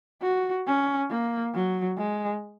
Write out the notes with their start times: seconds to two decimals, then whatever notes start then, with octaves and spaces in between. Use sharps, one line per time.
0.22 F#4
0.66 C#4
1.11 A#3
1.55 F#3
1.98 G#3